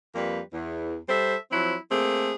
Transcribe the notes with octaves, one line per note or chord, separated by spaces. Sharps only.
F2 G3 A#3 B4
E2
G3 A4 C5 E5
F3 F#3 C4 E4
A3 A#3 C4 G#4